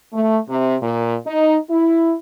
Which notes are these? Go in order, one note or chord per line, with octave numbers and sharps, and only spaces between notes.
A3
C3
A#2
D#4
E4